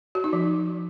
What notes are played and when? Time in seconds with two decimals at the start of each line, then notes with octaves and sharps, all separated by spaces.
0.15 F#4
0.24 D#4
0.33 F3